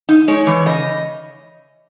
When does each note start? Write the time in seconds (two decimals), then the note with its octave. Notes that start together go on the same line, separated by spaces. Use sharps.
0.09 D#4
0.28 G#3 C#5
0.47 E3
0.66 C#3 D#5